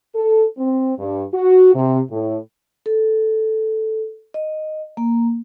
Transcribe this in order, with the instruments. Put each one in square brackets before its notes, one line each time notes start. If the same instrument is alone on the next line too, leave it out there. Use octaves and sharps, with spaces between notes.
[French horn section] A4
C4
G2
F#4
C3
A2
[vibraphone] A4
D#5
A#3